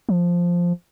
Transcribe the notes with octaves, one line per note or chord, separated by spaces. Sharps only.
F3